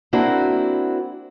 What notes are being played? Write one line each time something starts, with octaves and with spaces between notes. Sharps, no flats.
A#3 C4 D4 E4 F#4